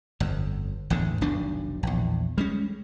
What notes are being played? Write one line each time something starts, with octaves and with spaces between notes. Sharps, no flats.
G1 F2
A1 E2 G#2 D3
F1 B1 D#3 D4
A#1 E2
G3 G#3 C#4